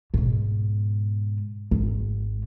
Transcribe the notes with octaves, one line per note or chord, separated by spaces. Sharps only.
G#2 B2
G#1